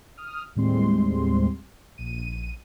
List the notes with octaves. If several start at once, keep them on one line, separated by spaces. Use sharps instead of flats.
D#6 F6
D#2 A2 G3 G#3 C4 C6
A#1 D#7